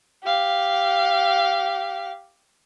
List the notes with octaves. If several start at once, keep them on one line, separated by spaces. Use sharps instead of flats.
G4 F5